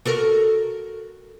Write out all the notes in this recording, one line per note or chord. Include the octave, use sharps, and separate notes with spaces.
F#4 A4 A#4